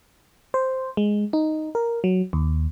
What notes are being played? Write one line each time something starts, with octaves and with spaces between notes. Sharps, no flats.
C5
G#3
D#4
A#4
F#3
D#2